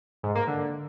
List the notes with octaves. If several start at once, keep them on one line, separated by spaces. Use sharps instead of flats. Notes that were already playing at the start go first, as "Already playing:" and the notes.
G#2
A#3
D3